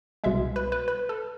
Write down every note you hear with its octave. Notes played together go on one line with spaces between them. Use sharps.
C2 B2 G#3 E5
B4
B4
B4
A4